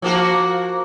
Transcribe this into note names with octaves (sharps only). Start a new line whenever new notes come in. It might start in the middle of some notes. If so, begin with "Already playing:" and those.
F3 A#3 F#4